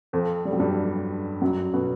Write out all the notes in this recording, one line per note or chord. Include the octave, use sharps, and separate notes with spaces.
F2 F3
G3
F#3
G2 G3
F#2 F#3
B2 B3